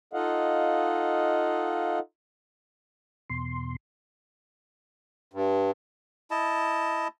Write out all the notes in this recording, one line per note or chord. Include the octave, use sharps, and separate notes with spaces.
D#4 F4 A4 D#5 F5 F#5
E2 B2 C6
G2
E4 D#5 A5